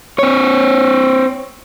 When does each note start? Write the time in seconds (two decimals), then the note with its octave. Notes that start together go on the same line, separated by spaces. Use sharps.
0.19 C4 C#5